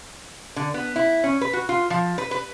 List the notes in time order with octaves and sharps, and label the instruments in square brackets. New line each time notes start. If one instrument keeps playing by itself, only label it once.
[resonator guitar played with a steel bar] D3
B3
E4
C#4
B4
F#4
F4
F3
B4
B4